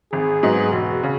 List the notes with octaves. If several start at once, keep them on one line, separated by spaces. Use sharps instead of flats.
G#1 G#4
G#2 F#3 B3 D#4
E1 F#4
C#3